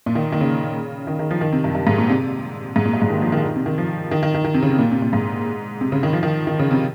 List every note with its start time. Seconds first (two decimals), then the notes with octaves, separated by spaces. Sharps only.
0.06 A#2
0.15 D#3
0.32 D#3
0.41 C#3
1.07 D#3
1.19 D#3
1.31 F3
1.41 D#3
1.52 C3
1.64 G2
1.75 G2
1.87 G#2
1.98 A#2
2.09 C3
2.76 G#2
2.86 A#2
2.93 G2
3.02 G#2
3.10 D#3
3.22 F3
3.32 D#3
3.44 D#3
3.56 C3
3.66 D#3
3.78 F3
4.11 D#3
4.23 D#3
4.35 D#3
4.45 D#3
4.54 C3
4.62 C#3
4.71 C3
4.79 A#2
4.91 C3
5.02 A#2
5.13 G#2
5.81 C3
5.92 C#3
6.03 D#3
6.13 F3
6.23 D#3
6.47 D#3
6.59 C#3
6.71 C3